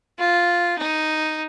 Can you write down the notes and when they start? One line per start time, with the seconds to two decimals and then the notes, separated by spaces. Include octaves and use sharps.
0.19 F4
0.78 D#4